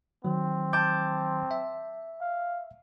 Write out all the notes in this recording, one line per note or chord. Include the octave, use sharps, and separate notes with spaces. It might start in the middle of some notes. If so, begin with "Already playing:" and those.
D#3 F#3 C4
A5 D6 G6
E5
F5